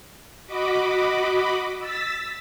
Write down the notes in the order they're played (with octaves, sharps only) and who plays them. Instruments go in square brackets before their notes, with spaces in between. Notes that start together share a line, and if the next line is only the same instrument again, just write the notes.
[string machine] F#4 D#5 B5 D6
E6 A6 B6